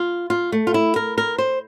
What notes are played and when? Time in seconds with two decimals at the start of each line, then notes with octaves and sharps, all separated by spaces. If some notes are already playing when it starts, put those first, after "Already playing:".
Already playing: F4
0.30 F4
0.52 A3
0.67 F4
0.74 E4
0.96 A#4
1.18 A#4
1.38 C5